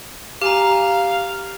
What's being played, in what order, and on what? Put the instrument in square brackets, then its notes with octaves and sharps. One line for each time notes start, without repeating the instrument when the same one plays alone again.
[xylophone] G4 G#5 A#5 [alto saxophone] F5